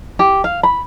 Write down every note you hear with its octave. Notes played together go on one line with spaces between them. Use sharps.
G4
F5
B5